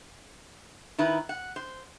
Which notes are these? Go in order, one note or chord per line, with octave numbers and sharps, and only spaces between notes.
D#3 D#4 E4 B4
F#5
C5